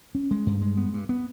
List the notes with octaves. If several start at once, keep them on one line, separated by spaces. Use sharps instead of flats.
C#4
G#3
G2
G#3
B3
G2
B3